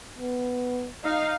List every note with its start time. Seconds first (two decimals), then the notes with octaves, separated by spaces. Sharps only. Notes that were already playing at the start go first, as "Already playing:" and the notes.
0.18 B3
1.04 D#4 F5